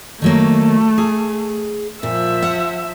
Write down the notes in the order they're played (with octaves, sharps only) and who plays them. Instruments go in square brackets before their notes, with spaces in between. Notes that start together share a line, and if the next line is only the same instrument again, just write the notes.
[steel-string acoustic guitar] D#3 F#3 A#3 [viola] A3
[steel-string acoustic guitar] G#4
[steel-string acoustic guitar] A#2 [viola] F3 E5
[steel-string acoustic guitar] F#5